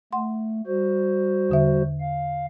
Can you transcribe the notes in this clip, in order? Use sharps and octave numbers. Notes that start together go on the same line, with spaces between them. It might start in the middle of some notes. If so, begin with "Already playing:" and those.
A3 F#5 C6
G3 F#4 C5
E2 D3 E5
F5